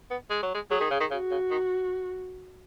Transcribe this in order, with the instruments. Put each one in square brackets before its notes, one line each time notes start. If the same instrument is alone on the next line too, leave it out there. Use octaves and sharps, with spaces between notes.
[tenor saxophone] B3
G#3
F#3
G#3
[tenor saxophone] F#3 [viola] G#4
[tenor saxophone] D#3
C#3
D#3
[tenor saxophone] C#3 [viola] F#4
[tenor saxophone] C#3
D#3